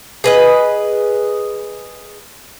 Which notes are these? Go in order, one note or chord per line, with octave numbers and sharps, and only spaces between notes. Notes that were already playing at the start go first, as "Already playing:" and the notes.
G#4 B4 D#5